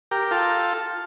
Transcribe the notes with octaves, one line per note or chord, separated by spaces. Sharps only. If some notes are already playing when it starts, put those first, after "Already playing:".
G4 A#4
F4 A4